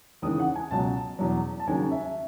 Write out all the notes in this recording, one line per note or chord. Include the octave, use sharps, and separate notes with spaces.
D#2 C#3 E3 D#6
F#5
G#5
C#2 B2 F#3 A5
E2 B2 F#3
A5
D#2 C#3 F#3 G#5
E5